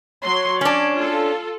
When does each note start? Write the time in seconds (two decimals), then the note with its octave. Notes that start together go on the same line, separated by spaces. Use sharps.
0.23 F#3 C#5 C6
0.61 C#4 D4 D5
0.95 F4 A4